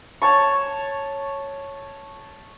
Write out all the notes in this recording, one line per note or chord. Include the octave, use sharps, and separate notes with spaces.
C#5 A5 C#6